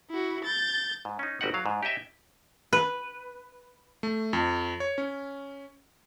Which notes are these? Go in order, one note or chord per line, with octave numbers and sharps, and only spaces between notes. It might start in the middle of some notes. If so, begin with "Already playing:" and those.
E4 F#4
G6 A6
G#2
C#4 D#4
G1 F#4 G4 D#5 F#5
F#3 F5
G#2
G4 C#5 D#5 E5
B4
A3
F2
C#5
C#4